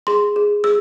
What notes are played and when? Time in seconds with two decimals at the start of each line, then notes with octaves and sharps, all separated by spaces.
0.07 G#4 C6
0.36 G#4
0.64 G#4 E6